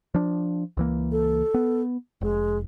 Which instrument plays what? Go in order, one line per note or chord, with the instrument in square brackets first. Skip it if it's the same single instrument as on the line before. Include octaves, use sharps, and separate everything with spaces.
[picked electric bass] F3 D4
C#2 E3 A#3
[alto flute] A4
[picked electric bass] B3
[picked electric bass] F1 [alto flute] G#3